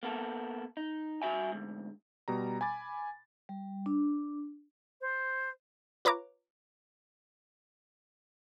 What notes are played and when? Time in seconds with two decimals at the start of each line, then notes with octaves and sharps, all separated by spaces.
0.03 A#3 B3 A4
0.77 D#4
1.22 G2 G#3 F#4 E5 G#5
1.52 D2 G#2
2.28 B2 G3 A#5
2.61 G#5 B5 D6 A6
3.49 G3
3.86 D4
5.01 C5
6.05 F4 B4 C#5 A#5 D6